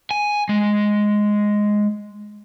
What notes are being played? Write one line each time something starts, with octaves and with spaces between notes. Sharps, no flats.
G#5
G#3